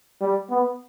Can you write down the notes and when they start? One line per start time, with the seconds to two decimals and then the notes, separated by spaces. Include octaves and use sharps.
0.21 G3
0.50 B3